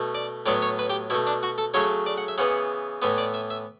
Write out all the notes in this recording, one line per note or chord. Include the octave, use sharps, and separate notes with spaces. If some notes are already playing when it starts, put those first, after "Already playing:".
Already playing: B2 A3
D5
A2 F#3 B3 D5
C#5
B4
G4
B2 A3 E4
D4
F#4
A4
C#3 F#3 A3 C#5
D5
F#5
E5
C#3 E3 B3 F#5
A2 E3 B3 E5
D5
E5
E5